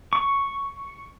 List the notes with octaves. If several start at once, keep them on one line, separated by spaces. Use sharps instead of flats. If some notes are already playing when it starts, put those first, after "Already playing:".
C#6